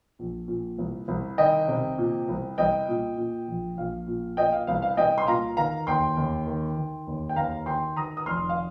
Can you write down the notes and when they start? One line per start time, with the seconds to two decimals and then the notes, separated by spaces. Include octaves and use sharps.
0.19 A#1
0.48 A#2
0.78 C2
1.08 C2
1.38 D#3 D#5 G5
1.68 C3
1.98 A#2
2.29 C2
2.58 C2 D#5 G5
2.88 A#2
3.17 A#2
3.48 A#1
3.77 A#1 F5
4.07 A#2
4.37 A#2 D#5 G5
4.53 F5
4.67 C2 F5
4.82 F5
4.97 C2 D#5 G5
5.18 C6
5.27 A#2 F5 A#5
5.57 D#3 F5 A#5
5.87 D#2 G5 C6
6.17 D#2
6.47 D#3
6.77 D#3
7.07 D#2
7.29 G5
7.36 D#2 F5 A#5
7.66 D#3 G5 C6
7.96 D#3 A#5 D#6
8.17 D#6
8.26 F1 C6 F6
8.49 F5